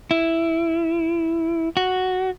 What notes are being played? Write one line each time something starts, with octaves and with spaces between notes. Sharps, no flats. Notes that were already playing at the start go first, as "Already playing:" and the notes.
E4
F#4